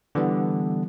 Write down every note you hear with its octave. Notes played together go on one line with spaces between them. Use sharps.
D3 E3 G3 B3